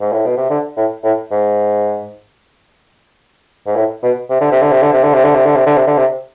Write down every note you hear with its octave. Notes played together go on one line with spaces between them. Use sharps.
G#2
A2
B2
C3
D3
A2
A2
G#2
G#2
A2
B2
C3
D3
C3
D3
C3
D3
C3
D3
C3
D3
C3
D3
C3
D3
C3
D3
C3